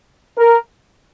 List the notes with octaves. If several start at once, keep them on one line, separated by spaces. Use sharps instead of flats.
A#4